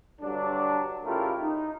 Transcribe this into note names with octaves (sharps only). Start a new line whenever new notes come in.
G2 D3 F#3 D4
C#3 A3 E4 F4 G4 A#4
D#4